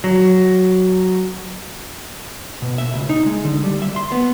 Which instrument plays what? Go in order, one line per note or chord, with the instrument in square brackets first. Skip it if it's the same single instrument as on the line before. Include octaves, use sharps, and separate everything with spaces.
[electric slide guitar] F#3
[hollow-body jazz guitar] B2
E5
C#2
D#4
G#3
D3
G3
E5
C6
B3